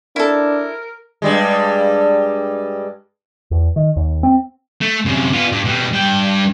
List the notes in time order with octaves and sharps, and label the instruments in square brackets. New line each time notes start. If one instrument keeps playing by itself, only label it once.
[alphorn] D4 [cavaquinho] E4 A4 [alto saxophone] A#4
[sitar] G2 G3 G#3
[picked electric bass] E2
D#3
D#2
C4
[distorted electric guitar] A3
F#2 C3
B3 F4
G2
B2 G3
G2 G5